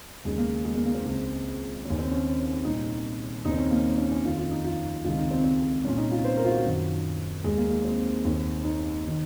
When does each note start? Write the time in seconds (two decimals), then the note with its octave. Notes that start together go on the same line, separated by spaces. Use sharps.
0.25 D#2 C#3 G#3
0.38 A#3
0.65 G#3
0.75 A#3
0.86 A#3
0.95 C4
1.06 C#2 C#3
1.85 D#2 C#3 C#4
1.98 C4
2.11 C#4
2.64 C2 A#2 D#4
3.45 D#2 C#3 D#4
3.51 C4
3.58 C#4
3.71 A#3
3.98 C#4
4.12 C#4
4.25 F2 D#3 F4
4.38 F4
4.51 D#4
4.64 F4
5.04 C#2 C3 D#3 F4
5.17 D#4
5.31 C4
5.44 C4
5.84 C2 A#2 C#4
5.97 D#4
6.11 F4
6.25 C5
6.37 A#4
6.45 F4
6.50 F#4
6.64 F#2 D#3
7.44 D#2 D#3 G#3
7.58 A#3
7.70 A#3
7.85 C4
8.25 D#2 D#3
8.64 D#4
9.08 D#3